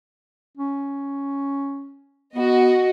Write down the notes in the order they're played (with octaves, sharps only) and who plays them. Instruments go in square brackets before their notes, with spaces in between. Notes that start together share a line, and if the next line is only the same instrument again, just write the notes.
[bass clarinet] C#4
[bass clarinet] B3 [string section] F#4 D#5